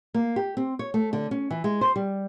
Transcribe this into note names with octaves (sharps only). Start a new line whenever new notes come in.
A#3
G4
C4
C#5
A3
D3
C#4
E3
G#3
C5
G3